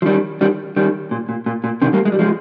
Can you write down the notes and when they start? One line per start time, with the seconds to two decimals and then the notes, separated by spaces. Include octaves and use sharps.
0.02 F3
0.06 D#3 G3
0.41 D#3 G3
0.76 D#3 G3
1.11 A#2
1.29 A#2
1.46 A#2
1.64 A#2
1.82 C3 D#3
1.93 G3 A#3
2.05 G#3
2.12 G3
2.19 F3 G#3